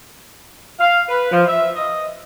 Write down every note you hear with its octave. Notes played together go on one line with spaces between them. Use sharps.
F5
B4
F3
E5
D#5